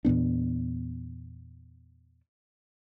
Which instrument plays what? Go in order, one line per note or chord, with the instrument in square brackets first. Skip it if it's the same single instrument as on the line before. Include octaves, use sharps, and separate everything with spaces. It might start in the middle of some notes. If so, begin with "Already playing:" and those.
[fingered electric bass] E2 A#2 B3 D4